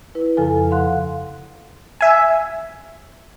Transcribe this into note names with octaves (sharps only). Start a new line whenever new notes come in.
E4 B4
F2 C#3 F3 A4 G#5
F5 F#5 C6 F#6
E5 G#5